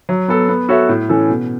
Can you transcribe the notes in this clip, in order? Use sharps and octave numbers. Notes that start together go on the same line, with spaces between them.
F#3
B3 A4
B3
F#4 A4 C#5 E5
A2
E3 C#4 A4
B2